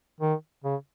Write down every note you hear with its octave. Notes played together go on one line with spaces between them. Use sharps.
D#3
C#3